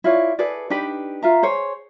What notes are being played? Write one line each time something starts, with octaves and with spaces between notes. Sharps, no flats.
E4 F4 C#5 D5
G#4 A4 B4 D5
D4 D#4 G4 B4
F4 E5 A#5
G#4 C5 C#5